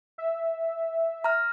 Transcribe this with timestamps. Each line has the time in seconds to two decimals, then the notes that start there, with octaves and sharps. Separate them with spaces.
0.18 E5
1.24 A#5 F6